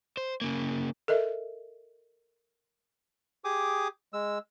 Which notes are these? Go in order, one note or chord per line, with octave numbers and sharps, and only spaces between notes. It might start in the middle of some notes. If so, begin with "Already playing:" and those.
C5
C#3 A#3
A4 A#4 D#5 E5
G4 G#4 D6 D#6
G#3 E6